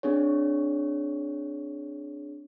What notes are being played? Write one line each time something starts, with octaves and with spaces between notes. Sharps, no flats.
C4 D4 G#4 C#5